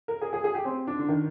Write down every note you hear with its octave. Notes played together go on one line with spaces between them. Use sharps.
A#4
G#4
G#4
G#4
G4
C4
D4
D3
D#3